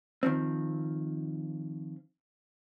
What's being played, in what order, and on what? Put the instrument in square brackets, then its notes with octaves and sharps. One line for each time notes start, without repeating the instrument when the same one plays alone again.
[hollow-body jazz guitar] D#3 F3 C4